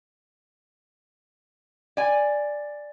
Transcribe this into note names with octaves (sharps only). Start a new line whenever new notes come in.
D5 G#5